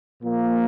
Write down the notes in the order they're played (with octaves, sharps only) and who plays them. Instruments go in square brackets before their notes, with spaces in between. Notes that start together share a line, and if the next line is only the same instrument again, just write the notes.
[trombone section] A#2 F3 A#3